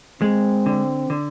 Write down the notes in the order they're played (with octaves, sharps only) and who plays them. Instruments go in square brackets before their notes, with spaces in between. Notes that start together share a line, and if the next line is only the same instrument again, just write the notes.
[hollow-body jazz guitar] G#3 [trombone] C4
[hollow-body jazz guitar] D3
D3